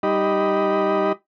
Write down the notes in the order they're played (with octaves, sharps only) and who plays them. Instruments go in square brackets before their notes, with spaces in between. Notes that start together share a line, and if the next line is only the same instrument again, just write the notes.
[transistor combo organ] G3 D#4 G4 D#5 B5